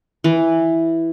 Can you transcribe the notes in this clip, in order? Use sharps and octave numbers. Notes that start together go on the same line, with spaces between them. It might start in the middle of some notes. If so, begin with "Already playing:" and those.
E3